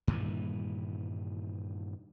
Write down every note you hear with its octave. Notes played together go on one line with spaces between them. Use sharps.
G2 A#2 D#3 E3